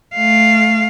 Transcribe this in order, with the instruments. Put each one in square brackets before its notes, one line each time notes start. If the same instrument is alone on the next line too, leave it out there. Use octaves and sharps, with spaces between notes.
[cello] A3 F5